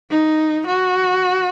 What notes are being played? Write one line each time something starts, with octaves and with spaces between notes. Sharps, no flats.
D#4
F#4